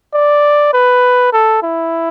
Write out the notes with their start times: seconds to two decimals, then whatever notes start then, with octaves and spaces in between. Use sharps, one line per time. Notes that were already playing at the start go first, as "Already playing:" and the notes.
0.14 D5
0.74 B4
1.33 A4
1.63 E4